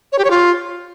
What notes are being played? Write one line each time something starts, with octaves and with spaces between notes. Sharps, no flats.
C#5
G4
C#5
F4